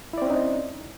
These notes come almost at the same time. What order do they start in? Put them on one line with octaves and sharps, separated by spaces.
E4 D5 C4 C#4 D#4